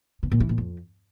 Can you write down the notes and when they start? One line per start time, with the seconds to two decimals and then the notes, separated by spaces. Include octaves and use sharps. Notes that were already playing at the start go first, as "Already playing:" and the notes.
0.23 B2
0.32 A#2
0.40 E3
0.49 A#2
0.58 F2